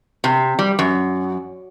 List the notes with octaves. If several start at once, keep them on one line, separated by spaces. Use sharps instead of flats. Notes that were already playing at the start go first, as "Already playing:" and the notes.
C3
G3
F#2